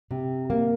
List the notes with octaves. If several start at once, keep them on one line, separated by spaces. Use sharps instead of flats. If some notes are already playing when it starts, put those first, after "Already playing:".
C3
A#3